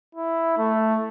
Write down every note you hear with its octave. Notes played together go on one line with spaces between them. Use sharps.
E4
A3